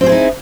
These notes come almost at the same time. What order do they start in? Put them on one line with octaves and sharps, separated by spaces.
C4 C5 G#4 E4 D#4